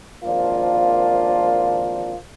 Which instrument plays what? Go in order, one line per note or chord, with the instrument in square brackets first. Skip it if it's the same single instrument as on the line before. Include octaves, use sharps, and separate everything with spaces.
[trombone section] G#1 F3 A#3 D4 F4